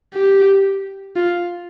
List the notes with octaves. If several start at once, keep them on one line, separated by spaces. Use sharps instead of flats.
G4
F4